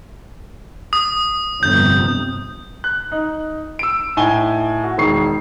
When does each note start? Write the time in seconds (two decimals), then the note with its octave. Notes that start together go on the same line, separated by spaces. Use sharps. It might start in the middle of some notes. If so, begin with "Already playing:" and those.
0.93 D#6
1.63 G1 F2 C3 G6
2.84 F#6
3.12 D#4
3.79 E6 D7
4.17 A2 D#4 G#5 G7
4.84 F#4
4.98 E1 D#3 C#6 C7